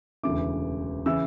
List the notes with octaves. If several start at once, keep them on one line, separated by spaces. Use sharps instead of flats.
E1 D2 C#3 E3 D6
C#3 E3 E6